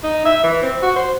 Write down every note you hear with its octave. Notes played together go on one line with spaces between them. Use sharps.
D#4
E5
E3
C4
F#4
C5